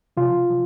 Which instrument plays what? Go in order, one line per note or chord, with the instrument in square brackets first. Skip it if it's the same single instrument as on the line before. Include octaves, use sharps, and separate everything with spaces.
[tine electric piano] C3 F3 F4
C3 F3